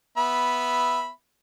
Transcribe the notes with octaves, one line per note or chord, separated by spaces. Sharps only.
B3 E5 B5